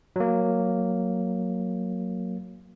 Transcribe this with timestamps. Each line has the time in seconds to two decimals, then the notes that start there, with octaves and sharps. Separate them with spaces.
0.16 F#3 A#3